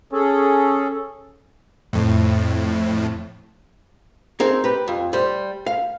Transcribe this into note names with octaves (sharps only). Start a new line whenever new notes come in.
C#4 G#4 A4
F2 A2
C4 D#4 G#4 A#4
G4 B4
F2
G3 C5
F5